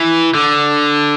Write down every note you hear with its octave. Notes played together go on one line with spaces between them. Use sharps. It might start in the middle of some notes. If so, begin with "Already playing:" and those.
Already playing: E3
D3